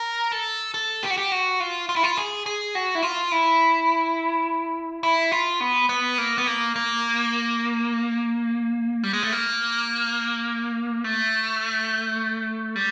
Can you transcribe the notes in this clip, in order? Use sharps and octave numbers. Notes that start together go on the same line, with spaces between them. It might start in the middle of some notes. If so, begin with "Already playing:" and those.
Already playing: A#4
A4
A4
G4
F#4
G4
F#4
F4
F4
E4
F4
G#4
G#4
F#4
E4
F4
E4
E4
F4
B3
B3
A#3
B3
A#3
A#3
G3
G#3
A3
A#3
A3
G3